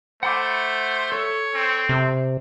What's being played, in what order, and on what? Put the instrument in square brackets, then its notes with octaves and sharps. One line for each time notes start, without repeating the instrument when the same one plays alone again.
[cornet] A3 [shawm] C5 [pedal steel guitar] F#5 B5 D6
[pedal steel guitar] A4 [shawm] C#5
[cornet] C4
[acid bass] C3